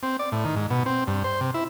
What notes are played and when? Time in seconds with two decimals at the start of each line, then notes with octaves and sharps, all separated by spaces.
0.03 C4
0.19 D5
0.32 A2
0.45 D#3
0.56 G#2
0.70 B2
0.86 C4
1.07 G2
1.24 C5
1.41 C3
1.54 E4